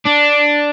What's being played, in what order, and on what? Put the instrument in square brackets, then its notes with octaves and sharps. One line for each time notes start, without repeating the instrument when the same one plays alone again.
[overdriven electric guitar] D4